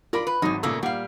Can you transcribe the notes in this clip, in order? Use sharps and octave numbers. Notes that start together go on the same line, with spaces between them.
F4 A#4 D5 B5
B4
G#1 E2 F#3 D#4
A#2 C#3 A3 A#3 E6
A#2 G3 F5 F#5